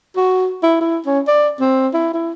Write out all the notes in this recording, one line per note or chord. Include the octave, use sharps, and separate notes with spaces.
F#4
E4
E4
C#4
D5
C4
E4
E4